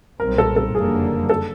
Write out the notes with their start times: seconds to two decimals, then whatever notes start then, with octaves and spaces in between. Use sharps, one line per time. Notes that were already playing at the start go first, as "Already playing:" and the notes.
0.19 B1 A#2 G3 C4 A#4
0.38 A4
0.56 A4
0.74 F#1 F2 D3 G3 A#3 G#4
1.30 A4